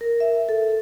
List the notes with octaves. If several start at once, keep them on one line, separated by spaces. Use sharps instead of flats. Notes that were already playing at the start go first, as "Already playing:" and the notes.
A#4
E5
A4